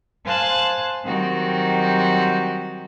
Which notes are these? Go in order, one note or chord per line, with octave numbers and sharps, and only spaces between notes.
C5 F5 G#5 A5 F#6
D#3 F#3 G3 C4 F#4 G4